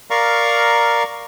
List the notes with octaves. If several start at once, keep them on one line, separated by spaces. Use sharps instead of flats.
A#4 D5 F5 A#5 C#6